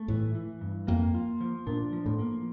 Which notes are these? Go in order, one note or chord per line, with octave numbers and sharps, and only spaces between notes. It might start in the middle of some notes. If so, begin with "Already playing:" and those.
Already playing: A3
A2 E3
E3
G2
F2 A#3
F4
F3
A#2 D4
F3
A2
A#3